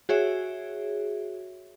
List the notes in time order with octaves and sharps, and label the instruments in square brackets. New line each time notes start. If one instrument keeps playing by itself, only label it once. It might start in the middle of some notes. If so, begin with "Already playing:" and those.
[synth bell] F#4 G#4 C#5 E5